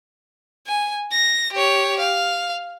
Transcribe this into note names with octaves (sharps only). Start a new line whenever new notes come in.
G#5
A#6
G4 C#5
F5